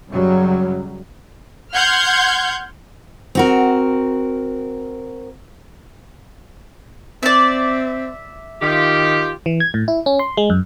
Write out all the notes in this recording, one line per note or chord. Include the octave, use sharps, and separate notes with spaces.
F#2 C#3 F#3 G3
F#5 C6 F6 G6 G#6
C4 F#4 A#4
C4 D5 E5
D#3 F4 G4
E3
G#6
A2
E4
C#4
C6
G#3
F#2